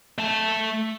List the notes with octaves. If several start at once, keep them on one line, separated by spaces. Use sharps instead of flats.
A3 A5